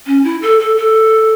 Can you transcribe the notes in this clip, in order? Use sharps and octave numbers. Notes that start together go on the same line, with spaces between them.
C#4
E4
A4
A4
A4